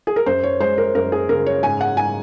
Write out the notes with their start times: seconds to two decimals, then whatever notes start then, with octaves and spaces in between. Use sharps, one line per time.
0.07 G#4
0.16 A#4
0.26 F#2 C5
0.44 C#5
0.60 G#3 C5
0.78 A#4
0.95 F#2 A#4
1.12 G#4
1.29 C#3 A#4
1.46 C#5
1.63 G#2 G#5
1.81 F#5
1.97 G#2 G#5